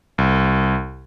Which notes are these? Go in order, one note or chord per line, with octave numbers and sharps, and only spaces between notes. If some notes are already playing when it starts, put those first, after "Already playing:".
C2